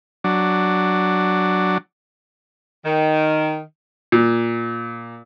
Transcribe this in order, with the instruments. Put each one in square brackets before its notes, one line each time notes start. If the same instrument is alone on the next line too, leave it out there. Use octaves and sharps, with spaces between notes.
[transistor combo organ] F#3 D4
[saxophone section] D#3
[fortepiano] A#2